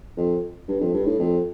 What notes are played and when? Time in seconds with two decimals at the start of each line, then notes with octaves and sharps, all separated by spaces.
0.17 F2
0.68 G2
0.80 F2
0.93 G2
1.06 A2
1.19 F2